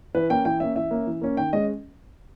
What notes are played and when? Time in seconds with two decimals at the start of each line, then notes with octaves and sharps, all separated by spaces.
0.15 E3 B4
0.29 A#3 C#4 G5
0.45 E3 G5
0.60 A#3 C#4 E5
0.76 E3 E5
0.91 A#3 C#4
1.07 E3
1.21 A#3 C#4
1.37 D#3 G5
1.53 G#3 C#4 D#5